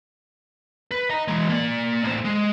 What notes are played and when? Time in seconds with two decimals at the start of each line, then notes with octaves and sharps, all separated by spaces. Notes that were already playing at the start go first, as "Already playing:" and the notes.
0.91 B4
1.10 D#5 A#5
1.28 E3 G#3
1.49 A#3 D5
2.04 A2 C5
2.25 G#3